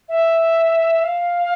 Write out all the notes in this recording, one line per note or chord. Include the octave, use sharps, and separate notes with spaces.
E5
F5